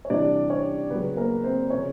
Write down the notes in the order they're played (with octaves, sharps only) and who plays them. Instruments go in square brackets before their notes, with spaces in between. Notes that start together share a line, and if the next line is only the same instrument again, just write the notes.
[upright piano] C#5
C3 E3 G3 D4 D5
C#4 C#5
C#3 F#3 B3 B4
A#3 A#4
C4 C5
C#3 F3 C#4 C#5